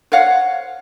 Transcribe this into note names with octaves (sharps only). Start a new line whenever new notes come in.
C5 C#5 F5 F#5